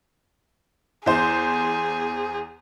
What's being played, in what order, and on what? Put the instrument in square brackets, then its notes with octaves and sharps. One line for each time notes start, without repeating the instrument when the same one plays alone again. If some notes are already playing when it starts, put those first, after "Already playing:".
[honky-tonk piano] E2 C5 [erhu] G#4